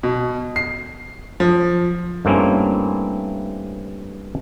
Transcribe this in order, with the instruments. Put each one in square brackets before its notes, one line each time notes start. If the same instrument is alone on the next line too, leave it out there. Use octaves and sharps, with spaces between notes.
[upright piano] B2
C7
F3
[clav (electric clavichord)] G2 A3 A#3 C4 C#4 E4